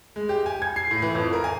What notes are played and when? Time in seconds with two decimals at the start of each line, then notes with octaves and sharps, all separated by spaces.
0.16 G#3
0.29 G4
0.46 G#5
0.62 G#6
0.76 C7
0.91 A2
1.02 E3
1.15 F2
1.33 A#4
1.44 G#5